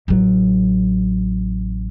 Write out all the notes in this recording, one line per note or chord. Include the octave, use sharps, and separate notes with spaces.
A1 F#3